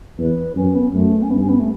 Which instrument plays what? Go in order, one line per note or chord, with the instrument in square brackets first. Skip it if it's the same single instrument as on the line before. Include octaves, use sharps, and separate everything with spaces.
[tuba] E2 [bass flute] B4
[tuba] F#2 [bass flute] C#4
[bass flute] B3
[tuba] F#2 [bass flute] A3
[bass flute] C#4
[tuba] G2 [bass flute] B3
[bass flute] C#4
B3
A3